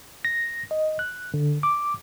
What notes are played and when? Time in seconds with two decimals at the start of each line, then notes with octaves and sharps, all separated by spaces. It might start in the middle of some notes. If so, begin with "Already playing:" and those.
0.25 A#6
0.71 D#5
0.99 F#6
1.34 D3
1.63 D6